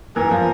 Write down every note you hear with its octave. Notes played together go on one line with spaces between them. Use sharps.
E3 A#4
F3